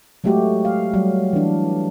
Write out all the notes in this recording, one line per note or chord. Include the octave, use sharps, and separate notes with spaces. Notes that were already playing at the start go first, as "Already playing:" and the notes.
F#3 G#3 A3 F#4 G4
F5
F#3 G3
E3 D4